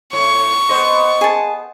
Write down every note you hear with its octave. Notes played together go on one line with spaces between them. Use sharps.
A2 C#5 C#6
B3 C5 D#5
G#4 A5